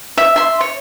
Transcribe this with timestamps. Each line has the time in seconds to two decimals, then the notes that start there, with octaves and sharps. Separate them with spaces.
0.17 E5
0.36 E5 C6
0.61 C#5